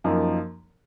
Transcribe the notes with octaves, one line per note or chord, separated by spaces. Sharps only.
F#2 F3 A#3 D#4